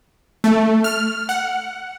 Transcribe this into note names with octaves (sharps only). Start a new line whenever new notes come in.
A3
F6
F#5